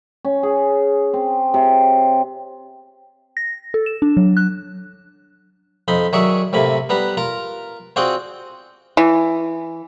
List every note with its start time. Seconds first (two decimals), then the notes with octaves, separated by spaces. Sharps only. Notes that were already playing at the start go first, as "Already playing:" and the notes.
0.25 C#4
0.43 G#4
1.13 C4
1.54 C3
3.37 A#6
3.74 A4
3.86 E7
4.02 D4
4.17 F#3
4.37 F#6
5.88 F2 D#4 B5 C6
6.13 D#3 F#3 G#4 D5 E5 C#6
6.53 A2 C3 A#3 B5
6.89 G3 B3 B4 A#5
7.17 F4 A#4 A#5
7.96 C4 F4 F#4 G#4 D5 G5
8.97 E3